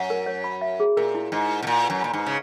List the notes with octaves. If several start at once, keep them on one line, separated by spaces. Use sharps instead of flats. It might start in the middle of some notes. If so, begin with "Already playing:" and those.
Already playing: F#2 F#5
A#4
C#5
B5
E5
G#4
A#2 A#4
E4
G#2 D#5
E4
B2
A#2 F#5
B4
F#2
A#2 B5
G#2
B4
C#3